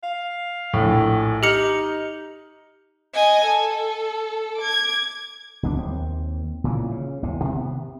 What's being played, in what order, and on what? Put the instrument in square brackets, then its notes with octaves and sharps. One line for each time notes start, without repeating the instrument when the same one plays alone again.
[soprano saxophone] F5
[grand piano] A#1 A2
[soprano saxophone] D#4 [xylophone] G4 C#7 [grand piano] F6 A#6 F#7
[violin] D#5 G#5
A4
D6 G#6
[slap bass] C#2 F#2 B3 D4
D#2 C4
A#2 C#3 E3
C#3
G#1 E2 C3
C3 D#3 B3